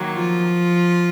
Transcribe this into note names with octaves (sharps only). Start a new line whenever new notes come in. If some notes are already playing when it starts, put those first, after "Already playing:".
Already playing: D#3 F#3 A#3
F3 F4